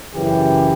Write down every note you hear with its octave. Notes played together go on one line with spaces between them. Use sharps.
F#2 C#3 E3 G4